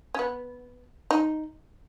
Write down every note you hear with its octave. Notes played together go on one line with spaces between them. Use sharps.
C#4
B3
D#4